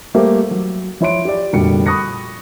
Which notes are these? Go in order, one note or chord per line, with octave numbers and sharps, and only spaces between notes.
G3 A3 A#3 G4 C5
F#3
F3 E4 C#5 C6 D7
G4 D5
F1 A#2 D3 G3 F#4 C#7
B5 C#6 D#6 F#6 A#6 C#7